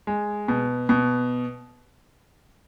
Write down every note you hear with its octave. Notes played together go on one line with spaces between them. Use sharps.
G#3
B2
B2